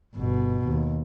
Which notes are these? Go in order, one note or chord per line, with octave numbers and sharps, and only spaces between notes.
G1 B2
D#2